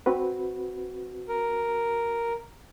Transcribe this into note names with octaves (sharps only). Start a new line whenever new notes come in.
C4 F#4 B4
A#4